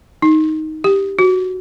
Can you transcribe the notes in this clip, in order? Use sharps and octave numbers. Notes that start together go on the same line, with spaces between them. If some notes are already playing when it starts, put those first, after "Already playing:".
D#4
G4
F#4